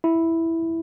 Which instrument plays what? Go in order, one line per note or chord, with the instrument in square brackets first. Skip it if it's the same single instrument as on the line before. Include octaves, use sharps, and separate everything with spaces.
[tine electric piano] E4